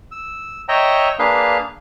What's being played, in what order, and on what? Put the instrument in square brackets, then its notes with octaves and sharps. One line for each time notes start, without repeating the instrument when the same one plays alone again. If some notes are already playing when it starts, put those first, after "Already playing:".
[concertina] E6
C#5 D#5 E5 G5 A#5
A#3 D4 G#4 B4 F5